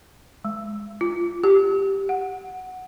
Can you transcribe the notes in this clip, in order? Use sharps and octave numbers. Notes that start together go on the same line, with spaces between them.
G#3
F4
G4
F#5